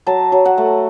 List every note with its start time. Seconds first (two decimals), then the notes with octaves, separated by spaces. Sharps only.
0.06 F#3 A5
0.32 F#3
0.45 F#5
0.58 A3